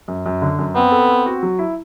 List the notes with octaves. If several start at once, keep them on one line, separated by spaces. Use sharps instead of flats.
F#2
F#2
D3
F#2
B3 C4
A4
C4
F#4
F#3
E4